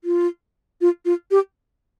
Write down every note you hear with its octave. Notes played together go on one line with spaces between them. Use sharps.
F4
F4
F4
G4